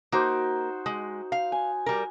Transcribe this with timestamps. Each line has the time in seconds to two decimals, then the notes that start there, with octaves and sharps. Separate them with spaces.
0.12 A#3 D#4 F#4 C5
0.86 G#3
1.32 F5
1.52 G#5
1.86 G3 A#4